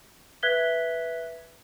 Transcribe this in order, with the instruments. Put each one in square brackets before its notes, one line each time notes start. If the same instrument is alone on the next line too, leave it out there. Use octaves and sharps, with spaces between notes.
[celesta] B4 E5 F#6 G#6 B6 G7